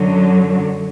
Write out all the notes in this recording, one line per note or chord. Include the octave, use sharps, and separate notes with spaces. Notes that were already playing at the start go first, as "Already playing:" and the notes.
Already playing: F#2 D3 F#3